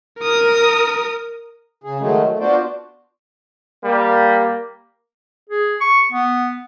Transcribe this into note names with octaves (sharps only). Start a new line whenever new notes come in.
A#4 D#6
C#3 G#4
D#3 F#3 G#3 A3 D#4
A3
B3 D4 F4 F#4 C5 D5
G3 A#3
G#4
C#6
B3